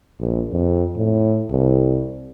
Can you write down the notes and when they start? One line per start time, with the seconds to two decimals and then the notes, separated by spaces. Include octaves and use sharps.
0.19 A#1
0.52 F2
0.96 A2
1.50 C2